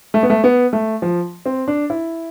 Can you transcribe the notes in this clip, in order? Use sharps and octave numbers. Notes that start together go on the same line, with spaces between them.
A3
B3
A3
B3
A3
F3
C4
D4
E4